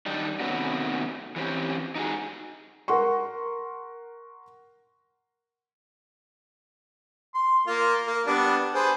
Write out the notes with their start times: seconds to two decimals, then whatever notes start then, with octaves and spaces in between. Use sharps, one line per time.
0.06 D#3 G3 D4 D#4
0.40 C3 D#3 A3 B3 C#4 F#4
1.36 E3 C4 C#4 G4
1.95 D#4 F#4 G#4
2.88 A#4 F#5 C6 C#6
7.34 C6
7.67 A#3 F4
8.06 A#3
8.27 G3 B3 D4
8.74 G#4 B4 C5